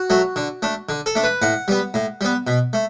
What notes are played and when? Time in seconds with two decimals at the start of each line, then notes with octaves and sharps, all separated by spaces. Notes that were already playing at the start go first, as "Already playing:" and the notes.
Already playing: F#4
0.10 F#3 A3
0.36 D3
0.62 A3 D4
0.89 D3
1.06 A4
1.15 A3 D4
1.24 B4
1.42 A2 F#5
1.68 G3 B3
1.94 A2
2.21 G3 B3
2.47 B2
2.73 A3